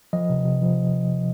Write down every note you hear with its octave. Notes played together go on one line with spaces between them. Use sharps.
F3 D#5
C3
C3
F3